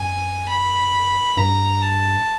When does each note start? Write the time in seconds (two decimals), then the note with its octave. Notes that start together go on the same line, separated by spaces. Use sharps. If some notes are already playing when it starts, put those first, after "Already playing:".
Already playing: F#2 G#5
0.49 B5
1.37 G2 A#5
1.82 A5